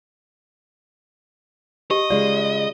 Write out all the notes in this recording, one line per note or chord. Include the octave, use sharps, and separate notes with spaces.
G4 D#5
C#3 G#3 F4 D5